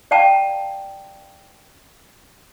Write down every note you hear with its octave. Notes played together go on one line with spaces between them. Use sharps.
D5 F5 G5 A5 A#5